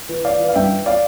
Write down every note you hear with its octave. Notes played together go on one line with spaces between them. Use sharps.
E3
E3 D5 F5
E3
F5
G2 E5 G5
E3
D5 F5